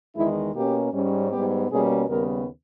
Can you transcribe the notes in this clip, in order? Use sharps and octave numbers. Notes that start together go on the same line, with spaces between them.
E2 D#3 G#3 E4
B2 A#3 C#4 G4
G#2 G3 C#4
G#2 G3 B3 G4
B2 G3 A#3 C#4 G#4
D#2 C#3 G3 B3 A#4